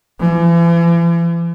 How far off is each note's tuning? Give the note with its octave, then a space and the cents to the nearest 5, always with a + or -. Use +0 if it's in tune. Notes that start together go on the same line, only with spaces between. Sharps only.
E3 +45